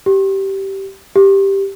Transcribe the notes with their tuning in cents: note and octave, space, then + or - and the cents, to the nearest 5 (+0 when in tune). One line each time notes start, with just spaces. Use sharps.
G4 -15
G4 +0